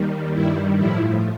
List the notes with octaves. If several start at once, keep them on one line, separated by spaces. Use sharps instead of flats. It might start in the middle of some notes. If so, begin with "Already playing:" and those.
Already playing: D#2 D#3 G3
G2 D#3 G3 E4
A2 F3 E4